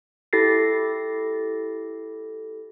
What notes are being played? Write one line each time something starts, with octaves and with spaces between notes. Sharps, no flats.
E4 G4 A4 A6 A#6 C7